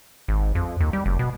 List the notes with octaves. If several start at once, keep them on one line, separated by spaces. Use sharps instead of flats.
G#1
F2
D#2
G3
F#1
B2